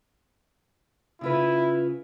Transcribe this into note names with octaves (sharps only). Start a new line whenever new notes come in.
C#3 E4 F4 B4